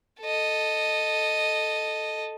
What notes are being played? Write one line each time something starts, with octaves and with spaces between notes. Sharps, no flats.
A4 D#5